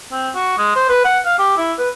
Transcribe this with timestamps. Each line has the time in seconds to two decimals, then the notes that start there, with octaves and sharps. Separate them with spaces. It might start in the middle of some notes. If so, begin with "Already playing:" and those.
0.12 C4
0.35 F#4
0.58 G#3
0.76 C5
0.89 B4
1.05 F#5
1.25 F5
1.38 G4
1.57 E4
1.79 B4